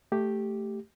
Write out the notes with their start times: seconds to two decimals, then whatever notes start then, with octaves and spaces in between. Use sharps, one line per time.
0.12 A3 G4